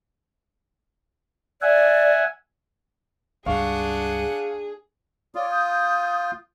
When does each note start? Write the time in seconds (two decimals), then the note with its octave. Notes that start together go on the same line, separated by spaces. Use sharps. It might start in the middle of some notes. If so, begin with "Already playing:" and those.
1.62 D5 E5 F#5 G#5
3.46 C#2 G2 D4 G#4 F5 F#5 C#6
5.35 F4 C#5 D5 D#6
5.50 D#6 G6